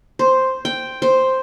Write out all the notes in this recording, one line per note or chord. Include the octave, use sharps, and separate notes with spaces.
C5
G5
C5